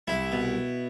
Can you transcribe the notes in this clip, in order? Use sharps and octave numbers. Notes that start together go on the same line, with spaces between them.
C2 E4
B2